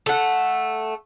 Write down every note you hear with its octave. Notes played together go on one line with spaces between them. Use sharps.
A3 F#5